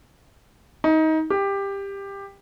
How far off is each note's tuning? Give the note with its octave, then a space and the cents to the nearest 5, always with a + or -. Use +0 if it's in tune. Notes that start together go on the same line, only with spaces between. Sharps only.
D#4 +25
G4 +15